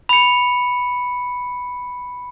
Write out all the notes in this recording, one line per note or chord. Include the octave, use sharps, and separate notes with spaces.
B5 C#7